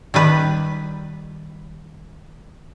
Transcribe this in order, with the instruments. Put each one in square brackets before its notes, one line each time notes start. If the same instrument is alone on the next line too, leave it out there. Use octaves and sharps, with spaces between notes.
[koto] D#3 G3 B4